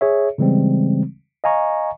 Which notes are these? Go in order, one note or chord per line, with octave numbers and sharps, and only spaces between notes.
G#4 C#5 E5
C#3 E3 G3 G#3 C4
D#5 F5 G#5 A#5 C#6